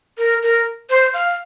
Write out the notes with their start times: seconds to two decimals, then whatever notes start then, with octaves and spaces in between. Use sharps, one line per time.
0.18 A#4
0.42 A#4
0.90 C5
1.14 F5